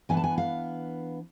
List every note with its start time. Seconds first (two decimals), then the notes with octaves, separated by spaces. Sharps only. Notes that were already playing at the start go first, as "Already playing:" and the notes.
0.09 E3 B3 D4 G#5
0.17 A5
0.24 G#5
0.38 F5